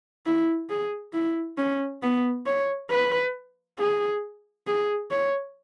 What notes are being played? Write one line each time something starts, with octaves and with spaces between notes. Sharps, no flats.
E4
G#4
E4
C#4
B3
C#5
B4
G#4
G#4
C#5